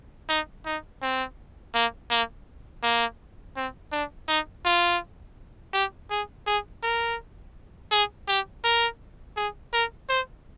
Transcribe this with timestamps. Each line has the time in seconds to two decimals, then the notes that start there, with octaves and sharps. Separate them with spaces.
0.29 D#4
0.66 D#4
1.02 C4
1.75 A#3
2.11 A#3
2.83 A#3
3.56 C4
3.92 D4
4.28 D#4
4.65 F4
5.73 G4
6.11 G#4
6.47 G#4
6.83 A#4
7.92 G#4
8.28 G4
8.65 A#4
9.37 G#4
9.73 A#4
10.09 C5